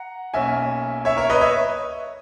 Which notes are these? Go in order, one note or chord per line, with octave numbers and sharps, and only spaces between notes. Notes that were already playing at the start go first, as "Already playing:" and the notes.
Already playing: F#5 A#5
B1 B2 A#3 C#4 E5 G#5
C#5 E5
A#4 C#5
B4 D#5
C#5 E5